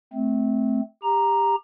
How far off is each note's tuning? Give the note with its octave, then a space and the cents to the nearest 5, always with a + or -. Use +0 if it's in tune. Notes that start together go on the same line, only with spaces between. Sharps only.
A3 -15 C4 -10
G4 +25 A#5 +0